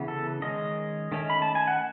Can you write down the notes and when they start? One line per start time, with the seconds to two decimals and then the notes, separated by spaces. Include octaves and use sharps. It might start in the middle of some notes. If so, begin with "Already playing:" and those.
Already playing: C#3 E3 B3
0.08 A4
0.42 D#3 G#3 C#4 D#5
1.12 D#3 A3 C#4
1.30 B5
1.42 A5
1.55 G#5
1.68 F#5